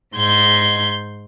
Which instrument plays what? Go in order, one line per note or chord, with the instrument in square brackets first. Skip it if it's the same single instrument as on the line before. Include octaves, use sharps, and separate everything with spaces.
[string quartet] G#2 C6 G6 G#6